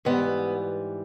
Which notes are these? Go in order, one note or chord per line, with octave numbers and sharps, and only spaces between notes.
G#2 E3 G3 B3